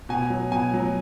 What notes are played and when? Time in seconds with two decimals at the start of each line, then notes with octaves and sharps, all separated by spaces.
0.09 B2 G#5
0.30 F#3
0.51 B2 G#5
0.74 F#3